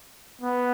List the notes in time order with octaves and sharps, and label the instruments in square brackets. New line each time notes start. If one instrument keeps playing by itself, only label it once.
[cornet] B3